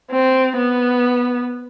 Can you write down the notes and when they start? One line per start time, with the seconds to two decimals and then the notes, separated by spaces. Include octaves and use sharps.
0.12 C4
0.58 B3